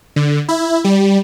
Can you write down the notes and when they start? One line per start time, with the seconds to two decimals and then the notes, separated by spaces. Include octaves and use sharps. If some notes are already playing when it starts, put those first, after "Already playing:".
0.16 D3
0.49 E4
0.84 G3